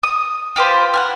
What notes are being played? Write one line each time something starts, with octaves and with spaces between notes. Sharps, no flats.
D#6
F4 G4 B4 C5
F#5 G#5 F6